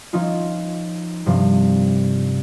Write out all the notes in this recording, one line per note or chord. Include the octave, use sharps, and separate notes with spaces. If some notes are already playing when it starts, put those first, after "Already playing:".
F3 C#4 D#4 F4
G2 C3 F3